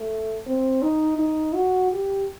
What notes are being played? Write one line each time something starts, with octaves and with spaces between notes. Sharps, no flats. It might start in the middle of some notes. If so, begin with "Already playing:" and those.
Already playing: A3
C4
D#4
D#4
F#4
G4